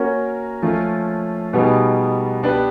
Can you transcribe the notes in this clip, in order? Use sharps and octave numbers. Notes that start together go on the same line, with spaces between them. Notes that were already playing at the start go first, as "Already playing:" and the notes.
Already playing: A#3 C#4 F#4 A#4 C#5
F3 A3 C#4 F4
B2 G3 B3 D#4 G#4
B3 D4 G4 B4